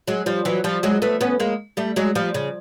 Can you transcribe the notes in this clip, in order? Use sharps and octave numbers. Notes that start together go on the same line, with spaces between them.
F#3 G#3
F3 G3
E3 F#3
F3 G3
F#3 G#3
A3 B3
B3 C#4
G#3 A#3
G3 A3
F#3 G#3
F3 G3
C#3